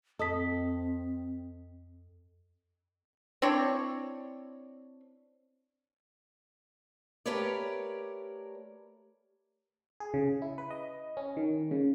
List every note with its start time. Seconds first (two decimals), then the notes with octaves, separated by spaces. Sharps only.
0.19 F2 C4 A4 D#5 D#6 B6
3.42 C4 D4 E4 C#5
7.26 A3 G4 A#4 B4 C#5 D5
10.00 G#4
10.14 C#3
10.42 E4
10.58 B4
10.71 D#5
11.17 C#4
11.37 D#3
11.71 C#3